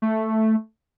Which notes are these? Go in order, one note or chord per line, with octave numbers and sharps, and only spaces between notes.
A3